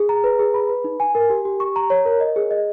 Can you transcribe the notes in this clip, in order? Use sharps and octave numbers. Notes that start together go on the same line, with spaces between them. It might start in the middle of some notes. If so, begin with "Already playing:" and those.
Already playing: G#4
A#5
B4
G#4
B5
B4
D#4
G#5
A#4
G4
G4
C#6
A#5
C#5
A#4
D#5
G#4
D#5